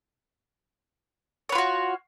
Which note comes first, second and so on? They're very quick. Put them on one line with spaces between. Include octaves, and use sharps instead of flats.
C#5 B4 F4 F#4